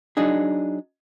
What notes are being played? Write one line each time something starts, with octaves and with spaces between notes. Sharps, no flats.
F#3 D4 D#4 G#4